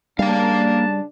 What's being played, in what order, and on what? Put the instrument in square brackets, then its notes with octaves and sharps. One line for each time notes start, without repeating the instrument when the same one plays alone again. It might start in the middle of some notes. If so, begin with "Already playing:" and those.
[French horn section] C#3 D4 [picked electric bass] G3 [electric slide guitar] A#3 F5 [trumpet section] A5